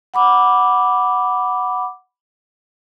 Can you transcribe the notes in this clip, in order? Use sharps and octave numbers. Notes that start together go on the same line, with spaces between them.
F#5 B5 D6